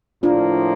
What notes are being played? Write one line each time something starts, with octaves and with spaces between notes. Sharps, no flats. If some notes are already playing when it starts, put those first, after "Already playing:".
A2 F3 A#3 D4 F4